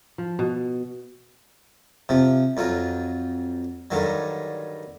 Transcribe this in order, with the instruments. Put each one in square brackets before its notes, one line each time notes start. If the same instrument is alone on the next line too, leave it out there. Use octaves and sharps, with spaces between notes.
[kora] F3
B2
[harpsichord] C3 F3
F2 F#3 F4
G2 D3 D#3 F#3